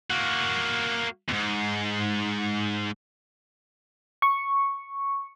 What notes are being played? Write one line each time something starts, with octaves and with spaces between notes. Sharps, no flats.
A#3 F#4
E2 G#2
C#6